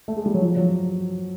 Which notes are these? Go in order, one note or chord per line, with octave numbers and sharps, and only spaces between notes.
A3
G#3
G3
F#3
F3
F#3